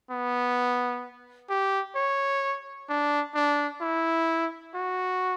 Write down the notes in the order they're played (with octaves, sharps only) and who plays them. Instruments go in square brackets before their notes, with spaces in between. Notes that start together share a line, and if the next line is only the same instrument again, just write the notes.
[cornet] B3
G4
C#5
D4
D4
E4
F#4